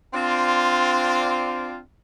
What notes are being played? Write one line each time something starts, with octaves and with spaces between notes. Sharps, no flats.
C4 D4 F4